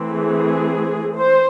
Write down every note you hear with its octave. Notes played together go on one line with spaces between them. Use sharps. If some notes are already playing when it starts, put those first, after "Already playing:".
Already playing: E3 A3 C4
G#4
C5